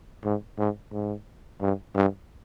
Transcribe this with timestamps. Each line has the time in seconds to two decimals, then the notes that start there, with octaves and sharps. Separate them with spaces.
0.25 G#2
0.59 G#2
0.93 G#2
1.61 G2
1.96 G2